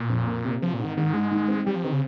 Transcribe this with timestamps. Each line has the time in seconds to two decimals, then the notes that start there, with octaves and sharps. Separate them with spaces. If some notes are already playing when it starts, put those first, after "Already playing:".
Already playing: A#2
0.09 F2
0.27 A#3
0.45 C3
0.62 F3 C4
0.74 A#2
0.79 G#2
0.84 D#3
0.97 G#2 D#3
1.14 G#2 G#3
1.31 D#3
1.48 C4
1.66 G3 G4
1.75 F3
1.84 D#3 C4
1.93 C#3